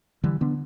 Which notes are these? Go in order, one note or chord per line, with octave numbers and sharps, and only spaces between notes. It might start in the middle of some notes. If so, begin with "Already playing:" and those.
D3 E3 G3
D3 B3 D4